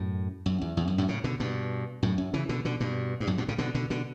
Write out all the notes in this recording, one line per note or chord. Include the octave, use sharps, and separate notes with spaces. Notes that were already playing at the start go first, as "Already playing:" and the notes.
Already playing: F#2 A2
F#2
E2
E2
F#2
F#2 A2
A2 C#3
B2 D3
G2 B2
F#2 A2
F#2
C#3 E3
B2 D3
B2 D3
G2 B2
G2
F#2 A2
G2 B2
A2 C#3
B2 D3
B2 D3
B2 D3